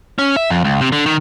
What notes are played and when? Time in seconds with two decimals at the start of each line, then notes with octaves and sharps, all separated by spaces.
0.18 C#4
0.36 E5
0.50 F2
0.64 C#2
0.81 C3
0.92 D3
1.06 D#3